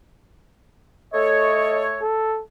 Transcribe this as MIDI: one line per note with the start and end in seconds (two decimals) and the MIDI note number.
1.13 2.00 57
1.13 2.00 69
1.13 2.00 73
1.13 1.84 75
2.01 2.42 69